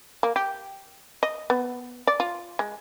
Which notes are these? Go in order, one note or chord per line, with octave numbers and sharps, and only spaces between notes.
A#3
G4
D#5
B3
D5
F4
G#3